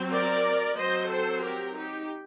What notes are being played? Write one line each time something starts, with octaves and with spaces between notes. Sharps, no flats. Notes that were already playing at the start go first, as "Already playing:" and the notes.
Already playing: F#3 C4
A#4 D5
F#3 C4 C5 D#5
A4 C5
G4 A#4
D#4 G4